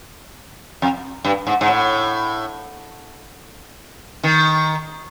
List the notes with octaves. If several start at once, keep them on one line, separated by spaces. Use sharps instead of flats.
F2
G2
G#2
G#2
A2
D#3